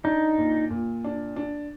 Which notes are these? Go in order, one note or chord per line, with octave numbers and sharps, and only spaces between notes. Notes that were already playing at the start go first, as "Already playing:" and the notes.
D4 D#4
A#2
A#2
D4
D4